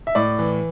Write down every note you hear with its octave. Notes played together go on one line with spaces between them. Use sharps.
E5
A2 D5
E3